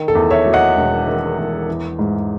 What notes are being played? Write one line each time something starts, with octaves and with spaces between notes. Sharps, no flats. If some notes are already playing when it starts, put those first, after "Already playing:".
Already playing: D#3
A4
E2
C#5 E5
F#3
D#5 F#5
E1
D#3
E2
E3
G#2